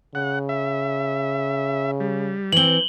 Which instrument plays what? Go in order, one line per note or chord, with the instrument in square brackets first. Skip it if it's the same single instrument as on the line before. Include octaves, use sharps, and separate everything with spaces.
[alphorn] C#3 [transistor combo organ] F#5
[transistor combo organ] E5
G3
[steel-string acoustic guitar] E3 C4 [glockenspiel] F#7 G7